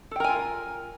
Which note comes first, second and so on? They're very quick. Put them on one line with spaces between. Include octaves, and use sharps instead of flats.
A4 G5 A#4 G#5 F4